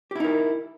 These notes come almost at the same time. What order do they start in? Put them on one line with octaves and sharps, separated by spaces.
G4 E4 D#4 A#4